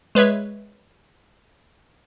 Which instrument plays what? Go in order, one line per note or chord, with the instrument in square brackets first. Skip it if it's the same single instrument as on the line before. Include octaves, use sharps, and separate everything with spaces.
[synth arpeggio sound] G#3 B4 C#5 E5